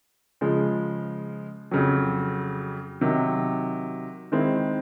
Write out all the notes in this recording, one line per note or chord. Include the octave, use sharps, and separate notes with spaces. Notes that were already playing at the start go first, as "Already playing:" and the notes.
C#3 F3 G#3
F2 C#3 F#3
C3 D#3 F#3
D#3 G#3 C4 E4